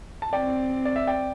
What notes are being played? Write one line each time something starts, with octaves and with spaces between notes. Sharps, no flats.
A5
C4 D5 G5
D5
E5
D5 G5